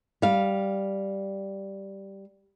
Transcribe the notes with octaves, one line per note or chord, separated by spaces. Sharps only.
G3 F5